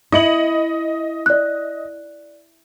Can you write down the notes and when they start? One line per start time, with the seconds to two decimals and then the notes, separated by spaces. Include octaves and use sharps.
0.12 E4 D#5 C#7 F#7
1.26 D5 F#6